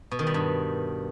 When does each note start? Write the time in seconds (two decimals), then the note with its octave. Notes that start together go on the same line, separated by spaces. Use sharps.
0.11 B2
0.19 D#3
0.27 G3
0.34 G2